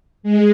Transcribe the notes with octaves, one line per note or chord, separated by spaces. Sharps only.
G#3